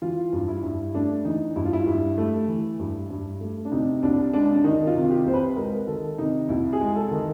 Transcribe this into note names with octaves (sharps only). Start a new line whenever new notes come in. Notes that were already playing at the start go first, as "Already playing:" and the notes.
E3 F4
G2
E4
G2
A3 D4
E3 D#4
G2 E4
F4
E4
G2
A3
E3
G2
G2
A3
D4
C3 D#4
C2 D4
G#3 D4
D4
D#3 D#4
F4
C3
G4
C2 C5
B4
G#3 A#4
D#3 A4
C3 D#4
C2 E4
G#4
G#3
A4
D#3